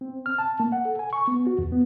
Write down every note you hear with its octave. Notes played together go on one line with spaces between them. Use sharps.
C4
F6
A5
A#3
F#5
A4
G#5
C#6
B3
F#4
E2
B3